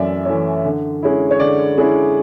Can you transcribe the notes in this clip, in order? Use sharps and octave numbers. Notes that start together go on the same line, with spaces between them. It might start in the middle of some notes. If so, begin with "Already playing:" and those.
Already playing: F#2 E3 A3 C#4 D5 E5
E3 A3 C#4
D3
G#3 C#4 E4
C#5
D3 D5
G#3 C#4 E4